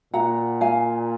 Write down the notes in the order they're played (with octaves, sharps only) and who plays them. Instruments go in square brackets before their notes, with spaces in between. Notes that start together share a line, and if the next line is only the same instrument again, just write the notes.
[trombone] A#2 [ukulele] F#5 A#5
[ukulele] F5 G#5